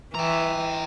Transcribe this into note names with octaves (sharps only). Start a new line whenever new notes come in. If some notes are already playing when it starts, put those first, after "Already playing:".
E3 G5 A#5